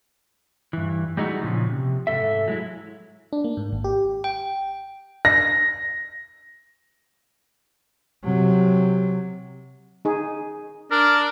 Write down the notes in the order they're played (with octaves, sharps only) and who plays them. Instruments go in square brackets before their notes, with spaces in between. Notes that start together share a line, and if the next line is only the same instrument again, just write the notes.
[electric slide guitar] G2 E3
G3 G#3 D#4 E4 F#4
A#2 C#3 F3
C3
G#2 D#3 A4 E5
F#3 G#3 E4
[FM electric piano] D4
A#3
G#2
G#1
G4
[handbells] G5
[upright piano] A#6
[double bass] C3 F#3
[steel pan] D#4 G#4
[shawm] D4 [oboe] A#4